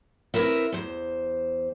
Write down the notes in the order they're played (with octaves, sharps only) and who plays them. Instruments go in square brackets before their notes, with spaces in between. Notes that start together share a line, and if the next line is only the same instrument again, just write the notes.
[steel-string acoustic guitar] C4 E4 F4 A#4 B4 E5
E2 C5